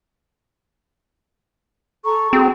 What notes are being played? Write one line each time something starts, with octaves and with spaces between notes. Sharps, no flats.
A4 A#5 C#6
C4 F#4 G#4